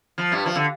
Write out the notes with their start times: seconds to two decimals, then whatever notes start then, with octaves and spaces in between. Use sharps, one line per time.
0.18 F3
0.32 G2 G3
0.46 F3
0.55 D3